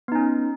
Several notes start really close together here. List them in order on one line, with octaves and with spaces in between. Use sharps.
B3 D#4 C#4